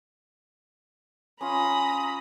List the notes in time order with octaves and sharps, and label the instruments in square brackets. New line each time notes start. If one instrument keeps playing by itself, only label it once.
[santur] C#4 F4 [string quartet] A#5 B5 D#6